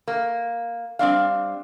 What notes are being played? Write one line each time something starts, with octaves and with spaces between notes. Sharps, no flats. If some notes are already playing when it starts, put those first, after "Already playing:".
A#3
G3 C4 D4 F5